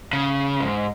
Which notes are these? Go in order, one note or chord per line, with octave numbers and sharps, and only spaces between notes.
C#3
G#2